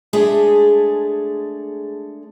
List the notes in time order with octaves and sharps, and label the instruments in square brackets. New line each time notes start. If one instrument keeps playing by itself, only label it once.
[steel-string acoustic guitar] G#3 A3 D4 G#4